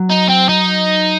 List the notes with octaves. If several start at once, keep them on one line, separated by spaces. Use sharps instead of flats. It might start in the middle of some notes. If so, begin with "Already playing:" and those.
Already playing: F#3
D#4
C4
D#4